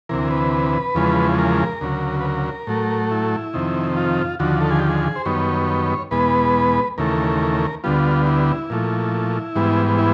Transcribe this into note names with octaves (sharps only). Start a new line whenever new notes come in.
D2 C3 E3 A#4
B4
E2 C#3 F3 G#3
A#4
D2 C#3 F#3
B4
A#4
A2 F#3 A3
E4
F2 C3 D#3
F4
D#2 D3 F3 F#4
A4
G#4
G4
G#4
C5
F#2 D#3 G3 B3 C#5
E2 B2 G#3 B3 B4
D#2 C#3 E3 A3 A#4
D2 D3 G3 B3 F4
E4
A#2 F3 A3
G#2 E3 G3 B3
E4